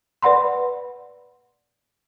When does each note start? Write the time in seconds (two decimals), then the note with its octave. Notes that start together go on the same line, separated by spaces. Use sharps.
0.22 B4 D5 F#5 B5 C6